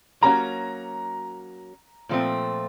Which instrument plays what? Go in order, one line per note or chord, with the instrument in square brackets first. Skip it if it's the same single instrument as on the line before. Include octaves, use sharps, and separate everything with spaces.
[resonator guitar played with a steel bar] F#3 A#3 C#4 F#4 [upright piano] A#5
[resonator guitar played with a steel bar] A#2 F3 A3 C4